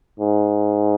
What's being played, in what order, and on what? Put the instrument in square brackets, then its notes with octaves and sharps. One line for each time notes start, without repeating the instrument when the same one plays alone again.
[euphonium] G#2